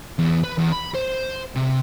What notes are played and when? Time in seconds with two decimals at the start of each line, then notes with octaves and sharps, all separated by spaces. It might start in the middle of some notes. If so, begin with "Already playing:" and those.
0.19 E2
0.44 B4
0.58 E2
0.73 B5
0.95 C5
1.55 C3